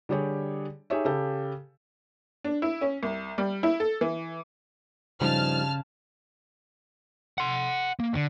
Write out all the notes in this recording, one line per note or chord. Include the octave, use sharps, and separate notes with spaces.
D3 G3 G4 G#4 C#5 D5
D#4 G4 G#4 C#5 E5
C#3 G4 A4
D4
E4
C#4
C2
G3
E4
A4
E3
G2 C#3 F3 D#4 A5 F6
F#5 C6
A#3
D3